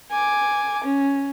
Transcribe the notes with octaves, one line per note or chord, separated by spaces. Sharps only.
G#5 D6
C#4